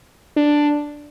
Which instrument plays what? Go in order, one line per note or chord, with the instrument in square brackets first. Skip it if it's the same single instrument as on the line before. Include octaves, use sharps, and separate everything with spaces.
[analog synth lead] D4